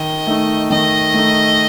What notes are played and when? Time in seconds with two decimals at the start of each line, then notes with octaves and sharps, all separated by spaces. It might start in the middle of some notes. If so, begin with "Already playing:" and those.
Already playing: D#3 D#5
0.27 A3 D#4
0.70 D#3 D#5
1.14 A3 D#4